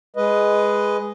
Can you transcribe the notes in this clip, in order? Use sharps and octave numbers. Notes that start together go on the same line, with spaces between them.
G#3 B4 D#5